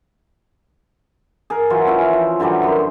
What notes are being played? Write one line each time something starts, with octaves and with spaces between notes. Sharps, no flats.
G#4 A#4
E3 F#3 F4
C#4 E4
F3
D3 E3 F#3 G3
F#2 C6